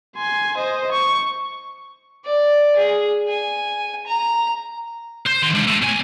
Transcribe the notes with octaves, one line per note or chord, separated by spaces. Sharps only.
G#5 C6
C5 D#5
C#6
D5
G#4
G#5
A#5
C5
D#3 C6
G#3 D4
A2
B1 G#5